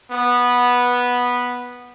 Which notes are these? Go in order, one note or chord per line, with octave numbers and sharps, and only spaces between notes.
B3